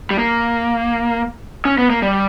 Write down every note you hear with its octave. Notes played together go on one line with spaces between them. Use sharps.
G3
A#3
C#4
B3
A#3
G3